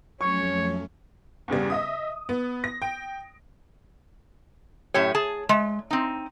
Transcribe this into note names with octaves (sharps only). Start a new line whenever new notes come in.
F2 F#3 A3 C#4 C#5 C#6
E2 G2 C#3 G3
D#5 E5 D#6
B3
A#6
G5 D7
F#2 A2 G4 C#5
G#4 A5
G#3
C4 D#4